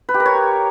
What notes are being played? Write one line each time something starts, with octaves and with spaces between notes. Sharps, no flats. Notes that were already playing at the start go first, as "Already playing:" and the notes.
B4
G4
A#4
C#5